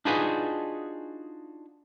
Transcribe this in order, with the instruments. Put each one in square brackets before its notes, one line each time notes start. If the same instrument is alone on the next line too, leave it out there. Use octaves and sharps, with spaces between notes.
[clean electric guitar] D4 D#4 F4 F#4 G#4 B4